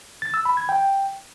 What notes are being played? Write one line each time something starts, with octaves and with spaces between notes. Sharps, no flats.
A6
E6
B5
G#6
G5